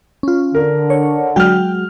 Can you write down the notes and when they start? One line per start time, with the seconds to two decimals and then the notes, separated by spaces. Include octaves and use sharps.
0.23 C#4 F4
0.55 D3 A#4
0.90 C#5
1.36 F#3 G#3 F#4 G5 F6